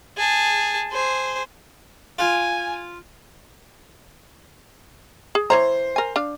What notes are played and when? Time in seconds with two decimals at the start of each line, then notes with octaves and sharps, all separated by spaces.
0.17 G#4 A5
0.91 G#4 C5
2.19 F4 G#5
5.35 G#4
5.50 E3 C5 C#5 A#5
5.96 A#4 G#5
6.16 D4 F5